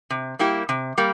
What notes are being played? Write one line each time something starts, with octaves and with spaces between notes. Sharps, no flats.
C3
G3 A#3 E4 G4
C3
G3 A#3